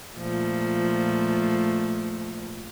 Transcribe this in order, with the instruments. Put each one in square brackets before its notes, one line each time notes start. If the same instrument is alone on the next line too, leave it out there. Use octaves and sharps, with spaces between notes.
[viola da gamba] A#2 F3 A3